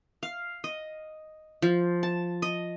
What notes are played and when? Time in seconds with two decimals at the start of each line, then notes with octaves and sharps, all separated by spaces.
0.23 F5
0.64 D#5
1.62 F3
2.03 A5
2.42 D#5